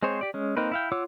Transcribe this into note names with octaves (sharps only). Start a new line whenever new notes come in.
G#3 C4 G#4 C5 C#5
G4 D5
G#3 C#4
A#3 C4 D#4 A#4 B4
E4 F5 G5
F4 C#5 F#5 D6 E6